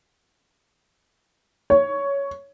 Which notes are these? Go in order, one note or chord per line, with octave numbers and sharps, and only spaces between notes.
C#5